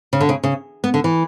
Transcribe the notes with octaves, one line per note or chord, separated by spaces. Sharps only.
C#3
D3
C#3
C#3
B3
D3
E3